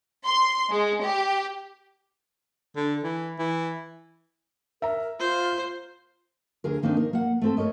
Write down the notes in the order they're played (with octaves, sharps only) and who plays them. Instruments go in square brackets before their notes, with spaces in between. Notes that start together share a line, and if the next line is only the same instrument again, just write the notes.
[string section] C6
G#3
G4
[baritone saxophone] D3
E3
E3
[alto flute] A#4 [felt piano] E5 A#5
[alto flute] F4 [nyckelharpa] C5
[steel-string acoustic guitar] D2 D3 G#4 A#4
D#3 A#3 C4 D4 D#4
A#4
A#3 F#5
A3 C4 A4
A3 A#4 C#5 D#5